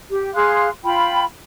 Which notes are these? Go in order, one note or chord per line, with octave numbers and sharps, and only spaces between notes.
G4
G#4 F5 C6 F#6
F4 G5 B5